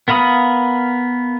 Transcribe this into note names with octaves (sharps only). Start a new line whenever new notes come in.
B3 A#4 F5 B5 D#6